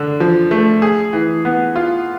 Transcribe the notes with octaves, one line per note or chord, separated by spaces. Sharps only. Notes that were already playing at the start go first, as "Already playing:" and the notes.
Already playing: D3 D4
F3
A3
G#4
E3
B3
F4